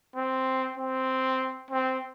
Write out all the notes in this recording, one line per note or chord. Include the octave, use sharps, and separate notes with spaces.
C4
C4
C4